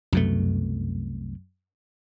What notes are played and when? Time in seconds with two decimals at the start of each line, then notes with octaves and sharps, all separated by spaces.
0.13 C2 F#2 B2 A3